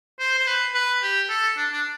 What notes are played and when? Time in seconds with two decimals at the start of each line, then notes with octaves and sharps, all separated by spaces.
0.20 C5
0.38 C5
0.47 B4
0.74 B4
1.02 G4
1.29 A4
1.57 D4
1.72 D4